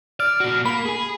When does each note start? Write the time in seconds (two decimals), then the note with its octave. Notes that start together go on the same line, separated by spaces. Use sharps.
0.20 D5 F6
0.40 A#2 F#4
0.65 A#3 B5
0.86 G#4 G#5